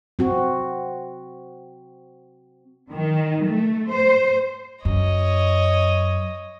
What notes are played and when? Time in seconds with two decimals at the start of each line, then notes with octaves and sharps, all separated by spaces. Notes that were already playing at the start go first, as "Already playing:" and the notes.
0.19 C4 F#4
2.92 D#3
3.45 A3
3.91 C5
4.85 F#2 C#5 D#5